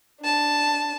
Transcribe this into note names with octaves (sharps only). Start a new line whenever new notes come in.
D4 A5